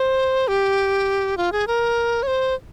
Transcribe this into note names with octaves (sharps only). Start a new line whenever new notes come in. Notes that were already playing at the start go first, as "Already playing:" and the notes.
Already playing: C5
G4
F4
G#4
A#4
C#5
C5